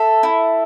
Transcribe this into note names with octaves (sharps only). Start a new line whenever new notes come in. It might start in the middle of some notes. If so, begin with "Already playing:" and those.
Already playing: A4 E5
E4